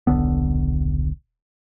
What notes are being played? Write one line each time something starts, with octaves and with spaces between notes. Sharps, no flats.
D#1 B1 D3 B3